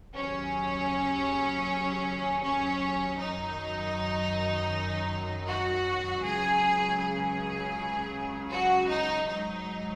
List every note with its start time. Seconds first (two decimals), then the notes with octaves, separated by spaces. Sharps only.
0.15 D#2 C#3 F#3 C#4
2.43 C#4
3.19 F#2 D#3 F#3 D#4
5.47 F#4
6.23 C#2 C#3 F#3 G#4
7.00 G#4
8.51 F#4
8.89 D#4
9.28 G#2 F#3 D#4